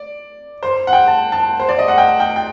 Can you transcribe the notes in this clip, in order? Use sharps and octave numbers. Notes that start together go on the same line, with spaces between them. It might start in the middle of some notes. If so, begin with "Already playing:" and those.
Already playing: D5
C5
F#5
G5
A5
A5
C5
D5
D#5
F#5
G5
G5
G5